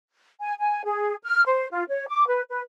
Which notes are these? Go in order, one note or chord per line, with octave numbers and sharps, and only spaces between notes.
G#5
G#5
G#4
F6
C5
F4
C#5
D6
B4
B4